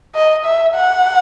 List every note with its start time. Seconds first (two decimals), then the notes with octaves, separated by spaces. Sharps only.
0.15 D#5
0.45 E5
0.75 F#5